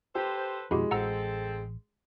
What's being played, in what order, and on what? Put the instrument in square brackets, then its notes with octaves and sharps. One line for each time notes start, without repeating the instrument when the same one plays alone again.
[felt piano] G4 [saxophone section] A4 B4 C5
[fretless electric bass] F2 B2 [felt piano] G#3 [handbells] E4 F#4 G4
[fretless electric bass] A1 [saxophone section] C4 A4 [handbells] F#5 A#5 E6